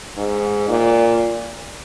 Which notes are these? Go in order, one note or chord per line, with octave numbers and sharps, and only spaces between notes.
G#2
A#2